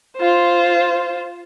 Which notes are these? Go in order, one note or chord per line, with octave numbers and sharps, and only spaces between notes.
F4 C5